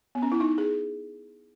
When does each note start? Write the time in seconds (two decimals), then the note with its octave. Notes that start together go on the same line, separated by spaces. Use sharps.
0.15 B3
0.22 C#4
0.32 E4
0.40 D#4
0.58 G#4